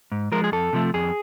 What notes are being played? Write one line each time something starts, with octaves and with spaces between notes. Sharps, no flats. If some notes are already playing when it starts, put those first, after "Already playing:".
G#2
F3 G#3 A#4
G#4
F2 A4
C3 F3 A3
F2 G#4